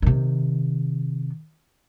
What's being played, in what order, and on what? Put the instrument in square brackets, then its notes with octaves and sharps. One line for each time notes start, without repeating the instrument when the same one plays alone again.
[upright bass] C3 D#3